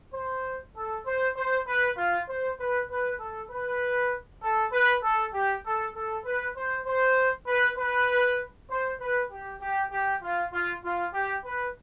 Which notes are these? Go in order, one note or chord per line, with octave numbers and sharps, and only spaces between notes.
C5
A4
C5
C5
B4
F4
C5
B4
B4
A4
B4
A4
B4
A4
G4
A4
A4
B4
C5
C5
B4
B4
C5
B4
G4
G4
G4
F4
F4
F4
G4
B4